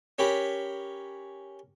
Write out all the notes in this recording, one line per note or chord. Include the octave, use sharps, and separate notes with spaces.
C#4 G4 A#4 B5